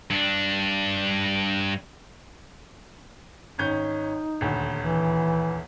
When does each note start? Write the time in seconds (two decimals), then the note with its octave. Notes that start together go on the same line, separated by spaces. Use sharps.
0.10 G2 D4
3.58 G#1 C#4 D#4 G6
4.41 D#1 D2
4.85 E3